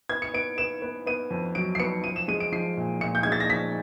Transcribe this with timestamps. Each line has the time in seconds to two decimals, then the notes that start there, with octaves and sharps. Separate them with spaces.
0.09 B3 G#6
0.22 C#7
0.34 B3 D7
0.58 B3 E7
0.82 B3
1.06 B3 D#7
1.31 F2
1.55 F#3 D7
1.75 C7
1.80 B3 C#7
2.04 F3 D#7
2.16 E7
2.28 G#3 D#7
2.40 D7
2.52 F3 C7
2.77 A#2
3.01 A#2 C#7
3.15 G6
3.23 G#3 G#6
3.32 A6
3.40 A#6
3.49 F3 B6